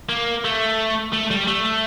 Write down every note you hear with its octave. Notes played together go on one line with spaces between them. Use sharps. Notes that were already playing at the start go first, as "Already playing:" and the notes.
A#3
A3
A3
G3
A3